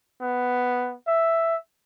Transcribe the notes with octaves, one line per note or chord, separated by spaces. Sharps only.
B3
E5